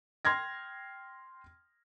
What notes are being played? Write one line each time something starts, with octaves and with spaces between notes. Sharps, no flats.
G5 C6 F6 G#6 A#6